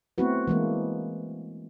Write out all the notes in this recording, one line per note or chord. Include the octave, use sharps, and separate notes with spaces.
A3 B3 C4 E4 F#4 B4
E3 G#3 A#3